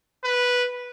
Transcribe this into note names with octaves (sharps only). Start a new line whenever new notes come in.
B4